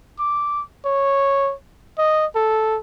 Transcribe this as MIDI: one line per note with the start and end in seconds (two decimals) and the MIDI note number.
0.19 0.62 86
0.85 1.53 73
1.98 2.26 75
2.35 2.79 69